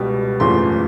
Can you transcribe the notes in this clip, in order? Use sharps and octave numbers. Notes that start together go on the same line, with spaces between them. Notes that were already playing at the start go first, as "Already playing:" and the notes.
Already playing: C#2 B2 G3
F#1 E2 C#3 F3 A3 C6